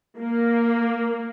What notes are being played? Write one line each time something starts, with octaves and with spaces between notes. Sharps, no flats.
A#3